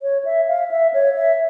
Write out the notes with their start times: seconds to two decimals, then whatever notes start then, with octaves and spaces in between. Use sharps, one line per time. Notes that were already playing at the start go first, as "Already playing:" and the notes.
0.02 C#5
0.25 E5
0.48 F5
0.71 E5
0.94 C#5
1.16 E5